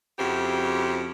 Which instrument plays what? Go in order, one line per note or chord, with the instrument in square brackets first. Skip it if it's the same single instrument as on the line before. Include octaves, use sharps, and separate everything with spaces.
[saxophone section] F2 C#3 E4 F#4 G4 C5